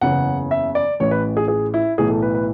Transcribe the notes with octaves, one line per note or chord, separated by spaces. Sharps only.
F#1 E2 C#3 F#5
E5
D5
A1 A2 E3 C#5
B4
G#4
G#4
E4
B1 A2 E3 G#4
A4
B4
B4